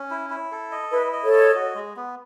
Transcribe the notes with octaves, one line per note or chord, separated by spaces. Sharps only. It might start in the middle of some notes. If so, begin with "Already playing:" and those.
Already playing: C#4
E4
E4
A4
D#5
E4 B4
D#5
A4 C#5
D#5
F#4
G#3
B3